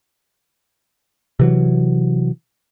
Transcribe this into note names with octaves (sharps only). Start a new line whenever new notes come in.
C3 E3 F#3